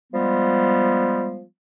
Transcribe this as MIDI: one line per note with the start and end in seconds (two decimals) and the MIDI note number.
0.12 1.42 53
0.12 1.42 55
0.12 1.42 56
0.12 1.42 59